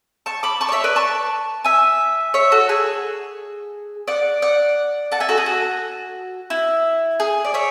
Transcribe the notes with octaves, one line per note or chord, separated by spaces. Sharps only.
A5 C#6
B5 D6
A5 C#6
D5
C#5 E5
B4 D5
A5 C#6
E5 G#5
C#5 E5
F#4 A4
G#4
D5 F#5
D5 F#5
F#5 A5
E5 G#5
F#4 A4
G#4
F#4
E4
G#4
D5
C#5 E5